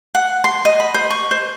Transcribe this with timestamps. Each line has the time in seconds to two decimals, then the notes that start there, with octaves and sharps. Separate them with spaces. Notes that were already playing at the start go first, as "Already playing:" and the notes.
0.15 F#5
0.44 C6
0.65 D#5
0.80 B5
0.94 C5
1.10 C#6
1.31 C5